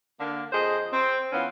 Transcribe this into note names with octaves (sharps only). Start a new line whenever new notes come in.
D3 A#3
F2 G#4 C5 D#5
C4
E3 B3 C#4 F4